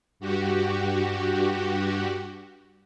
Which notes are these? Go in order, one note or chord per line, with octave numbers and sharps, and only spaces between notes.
G2 F#4 G4